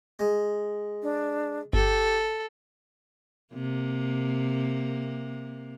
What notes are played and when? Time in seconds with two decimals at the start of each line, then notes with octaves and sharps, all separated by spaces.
0.19 G#3
1.03 D4
1.73 G1 G4 A4
3.54 C3 A#3